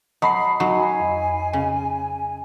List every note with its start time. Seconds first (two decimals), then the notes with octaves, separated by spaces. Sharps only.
0.22 F#3 D#5 A5 B5 C7
0.60 F#3 D#4 F#4 G#5
1.00 F2
1.53 C#3